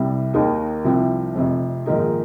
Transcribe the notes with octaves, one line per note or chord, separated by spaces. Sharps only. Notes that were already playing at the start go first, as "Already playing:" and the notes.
Already playing: C2 C3 G3
D#2 D#3 A#3 D#4
C2 C3 F3 C4
F1 F2 C3
A#1 G#2 D#3 A#3 D#4